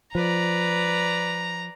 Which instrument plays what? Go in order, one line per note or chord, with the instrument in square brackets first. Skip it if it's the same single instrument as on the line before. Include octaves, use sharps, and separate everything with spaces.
[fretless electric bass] F3 [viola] B4 D5 [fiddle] A#5